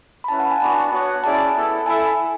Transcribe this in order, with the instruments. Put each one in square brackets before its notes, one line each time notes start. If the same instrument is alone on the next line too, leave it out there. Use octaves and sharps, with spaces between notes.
[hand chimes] B5
[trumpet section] C#4 E4 B4 [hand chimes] A5
[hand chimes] F#5
G#5
[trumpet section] B3 D4 F#4 [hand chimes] A5
[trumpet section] B3 F#4 C#5 F#5
[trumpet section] C#4 E4 G#4 D5 [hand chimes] A5
[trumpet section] B3 E4 A4
[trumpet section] E4 A4 E5 [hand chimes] G#5